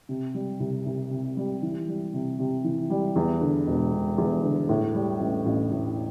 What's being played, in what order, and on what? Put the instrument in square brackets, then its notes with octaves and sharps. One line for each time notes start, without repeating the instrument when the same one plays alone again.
[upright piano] C3
G3
C2
C2
C3
G3
E3
G3
C3
C3
E3
G3
E2
D3
E1
E1
E2
D3
A2
G3
A1
A1
A2